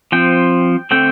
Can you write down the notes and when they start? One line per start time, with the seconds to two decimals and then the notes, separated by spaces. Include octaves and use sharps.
0.12 F3 C4 G5
0.91 D3 A3 C4 G5